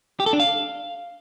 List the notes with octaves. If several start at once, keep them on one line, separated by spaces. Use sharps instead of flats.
G4
A4
D4
F5